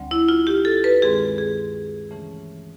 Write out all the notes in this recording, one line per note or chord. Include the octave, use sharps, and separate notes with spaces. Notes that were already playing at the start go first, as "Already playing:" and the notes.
Already playing: D2 D3 G3 C4
E4
F4
G4
A4
B4
G2 D#3 G#3 C4 G#4
G#4
C#3 E3 A3 C#4